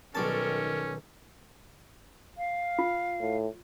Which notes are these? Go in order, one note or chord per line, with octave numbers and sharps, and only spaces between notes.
B1 D#3 G3 C#4 A4 A#4 A5
F5
F4
A2